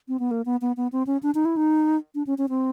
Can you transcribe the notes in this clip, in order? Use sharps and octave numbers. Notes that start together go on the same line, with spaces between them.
C4
B3
A#3
B3
B3
B3
C4
C#4
D4
D#4
E4
D#4
D4
C#4
C#4
C4